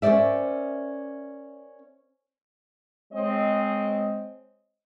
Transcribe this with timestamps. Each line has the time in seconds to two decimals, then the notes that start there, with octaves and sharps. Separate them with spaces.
0.02 C#4 A#4 C5 D5 E5
3.13 G#3 C4 C#5 D#5